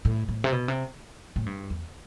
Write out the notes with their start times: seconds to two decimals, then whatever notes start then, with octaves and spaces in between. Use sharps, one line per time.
0.05 A2
0.29 A2
0.44 C3
0.52 B2
0.68 C3
1.36 A2
1.46 G2
1.70 E2